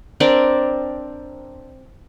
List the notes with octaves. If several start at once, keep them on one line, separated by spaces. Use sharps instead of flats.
C4 D4 A#4 D5